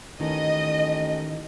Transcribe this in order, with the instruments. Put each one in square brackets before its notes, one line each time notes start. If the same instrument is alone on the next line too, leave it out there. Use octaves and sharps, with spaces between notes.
[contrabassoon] A1 [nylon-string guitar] D#3 [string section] D#5